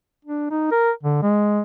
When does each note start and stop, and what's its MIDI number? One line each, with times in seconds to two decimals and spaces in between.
0.25 0.47 62
0.51 0.69 63
0.72 0.91 70
1.03 1.18 50
1.22 1.62 56